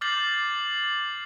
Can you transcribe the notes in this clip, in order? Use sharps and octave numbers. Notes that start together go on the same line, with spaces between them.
D6 F6 G6 A6 C7 F#7